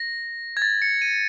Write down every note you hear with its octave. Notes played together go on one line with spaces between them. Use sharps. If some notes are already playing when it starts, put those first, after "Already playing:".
Already playing: A#6
G#6
A6
C#7
D#7